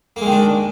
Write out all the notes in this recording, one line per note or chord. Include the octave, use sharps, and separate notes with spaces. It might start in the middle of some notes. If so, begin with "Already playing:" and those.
D#3 G#3 A#3 D4